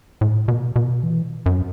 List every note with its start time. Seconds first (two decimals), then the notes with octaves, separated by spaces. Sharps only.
0.21 A2
0.48 B2
0.76 B2
1.03 E3
1.46 F#2